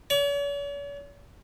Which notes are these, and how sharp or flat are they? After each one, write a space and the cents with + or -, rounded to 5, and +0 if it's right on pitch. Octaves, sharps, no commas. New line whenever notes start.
C#5 +45